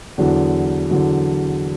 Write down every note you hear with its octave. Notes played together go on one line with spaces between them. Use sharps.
E2 D3 F#3
E2 D3 F#3